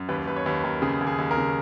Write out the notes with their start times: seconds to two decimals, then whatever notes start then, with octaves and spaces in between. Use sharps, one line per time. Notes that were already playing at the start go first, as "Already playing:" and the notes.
Already playing: F#2
0.09 D#2 B4
0.27 D#2 B4
0.36 C#5
0.46 D#2 B4
0.64 D#2 A#4
0.82 C#3 G#4
1.01 D#2
1.07 G#4
1.18 D#2
1.31 A#4
1.37 C#3